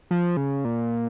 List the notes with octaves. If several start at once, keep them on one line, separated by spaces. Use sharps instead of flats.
F3
C#3
A#2